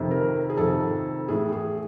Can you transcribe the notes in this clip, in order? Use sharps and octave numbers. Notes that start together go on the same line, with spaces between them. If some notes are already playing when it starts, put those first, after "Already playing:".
Already playing: F2 C3 D#3
A#4
G#4
F2 C3 D#3 A4
A2 E3 G#4
G#4